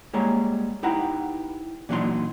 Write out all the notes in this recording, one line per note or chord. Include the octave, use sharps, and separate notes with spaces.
G3 G#3 A#3 G#4 C#5 A#5
D#4 E4 G4 B4 F#5 A#5
A#2 E3 F#3 D4 D#4 C6